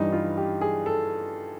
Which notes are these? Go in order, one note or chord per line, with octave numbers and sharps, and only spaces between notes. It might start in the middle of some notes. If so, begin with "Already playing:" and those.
Already playing: G2 E3 G3 D#4
F4
G4
G#4
A4